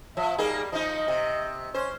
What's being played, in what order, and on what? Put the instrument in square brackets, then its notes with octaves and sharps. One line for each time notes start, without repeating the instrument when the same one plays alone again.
[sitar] F3 [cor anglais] E5
[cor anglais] G3 [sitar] A#3 D#4 G#4
[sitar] F3 D#4 [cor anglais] D#5
[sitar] C3
[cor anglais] C#4 [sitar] C5